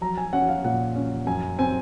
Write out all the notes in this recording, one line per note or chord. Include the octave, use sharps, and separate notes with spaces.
F#3 A#5
G#5
C#4 F#5
F5
A#2 F#5
C#4
F#2 G#5
C4 G#5